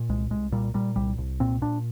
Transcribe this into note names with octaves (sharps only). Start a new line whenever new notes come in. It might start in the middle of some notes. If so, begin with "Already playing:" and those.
Already playing: A#2
C2 G#3
C2 G#3
A#2 G3
A#2 G3
C2 G3
C2
A#2 C4
A#2 D4